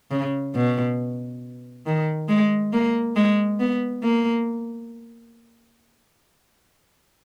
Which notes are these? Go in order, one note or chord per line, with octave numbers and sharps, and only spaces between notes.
C#3
B2
D#3
G#3
A#3
G#3
B3
A#3